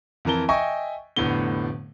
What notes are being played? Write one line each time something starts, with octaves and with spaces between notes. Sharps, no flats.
F2 E3 A#4 A5 G7
D#5 E5 G5 G#5 C#6
F1 A2 D3 B3 G7